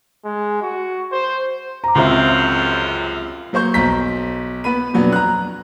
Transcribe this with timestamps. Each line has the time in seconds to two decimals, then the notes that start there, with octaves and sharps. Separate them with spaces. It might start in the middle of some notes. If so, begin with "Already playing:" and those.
0.25 G#3
0.62 F#4
1.12 C5
1.84 A#5 D6
1.95 C#2 F#2 C3 F3 C4 E5
3.53 F#3 A#3 C5 C#6 G6
3.74 B1 A#5 B6
4.64 B3 B4 B5 D#7
4.93 F2 B2 F#3 B3 D4
5.13 A#5 F#6